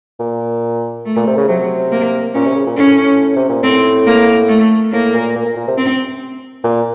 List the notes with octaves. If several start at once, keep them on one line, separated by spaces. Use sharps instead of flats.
A#2
A3
A#2
C3
C#3
C3 F#3
A#3
A#2 C#4
C3
C#3
A#2
A2 C#4
C3
A#2
A2 C4
A#3
A3
A2 A#3
A#2
A#2
A#2
A#2
C3
C4
A#2